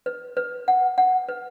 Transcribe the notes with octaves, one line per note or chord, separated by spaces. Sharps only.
B4
B4
F#5
F#5
B4